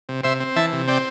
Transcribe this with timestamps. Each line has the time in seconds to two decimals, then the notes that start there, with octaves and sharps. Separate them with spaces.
0.09 C3
0.24 C3 C5 E5
0.40 C4
0.56 E3 E5 A5
0.73 C3
0.88 C4 D5 G5